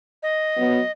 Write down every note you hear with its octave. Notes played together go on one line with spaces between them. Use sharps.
D#5
F#3 B3